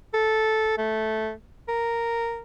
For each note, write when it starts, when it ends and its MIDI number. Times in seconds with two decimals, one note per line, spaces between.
0.14 0.76 69
0.78 1.32 57
1.68 2.42 70